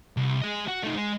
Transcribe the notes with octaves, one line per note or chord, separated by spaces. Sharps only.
C2
G#4 D#5
F#4
A3 D#4
G#3